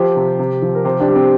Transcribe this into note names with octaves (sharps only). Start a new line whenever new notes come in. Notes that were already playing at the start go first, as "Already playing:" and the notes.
Already playing: F3 G4 C5
C3
C3
F3
A#4
C3 G4 C5
D4 G4
G3
C4